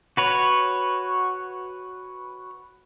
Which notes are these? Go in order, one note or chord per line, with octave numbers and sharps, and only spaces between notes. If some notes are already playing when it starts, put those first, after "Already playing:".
F#4 B4 C#5